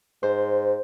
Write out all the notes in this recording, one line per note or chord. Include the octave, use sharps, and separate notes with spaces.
G#2 C5